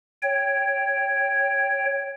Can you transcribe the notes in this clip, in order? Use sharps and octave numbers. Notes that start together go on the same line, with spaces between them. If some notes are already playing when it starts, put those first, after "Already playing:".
C#5 G5